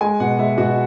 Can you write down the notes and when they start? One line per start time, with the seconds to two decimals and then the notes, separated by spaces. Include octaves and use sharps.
0.01 G#3 G#5
0.20 B2 F#5
0.39 G#3 E5
0.58 B2 F#4